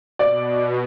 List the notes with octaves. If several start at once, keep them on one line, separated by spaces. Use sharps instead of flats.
B2 D5